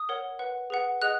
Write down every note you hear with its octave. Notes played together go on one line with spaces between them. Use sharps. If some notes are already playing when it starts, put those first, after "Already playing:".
Already playing: D#6
A#4 C#5 F#5
B4 F#5
G#4 B4 F#5
G#4 D#5 F#5 F#6